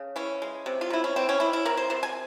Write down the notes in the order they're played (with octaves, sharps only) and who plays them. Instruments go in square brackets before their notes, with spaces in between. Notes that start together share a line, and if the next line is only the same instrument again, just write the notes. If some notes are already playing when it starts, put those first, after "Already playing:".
Already playing: [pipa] C#3
E3 C#4
G#3
C3
F4
C3 E4
C#4
E3 C4
C#4
G3 E4
E4
C3 A#4
C5
C3 C5
G#5